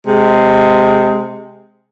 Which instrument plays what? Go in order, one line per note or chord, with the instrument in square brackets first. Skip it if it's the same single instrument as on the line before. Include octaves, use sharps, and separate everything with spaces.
[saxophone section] C3 G#3